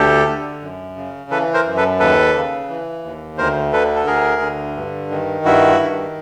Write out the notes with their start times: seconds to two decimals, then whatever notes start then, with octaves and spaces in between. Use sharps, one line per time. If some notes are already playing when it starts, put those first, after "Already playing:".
Already playing: D2 G4 A4
0.27 D3
0.62 F#2
0.96 C#3
1.30 E3 A4 B4
1.54 A#4 C5
1.66 F#2
1.77 A4 B4
2.00 D#2 A4 B4
2.35 C#3
2.69 E3
3.04 D#2
3.38 D2 A#4 C5
3.73 D3 A4 B4
3.95 A4
4.07 D2 G#4 A#4
4.42 D3
4.76 G2
5.10 D#3
5.45 G2 E4 F#4
5.80 D#3